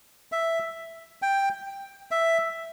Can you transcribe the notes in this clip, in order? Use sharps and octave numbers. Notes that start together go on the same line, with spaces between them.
E5
G5
E5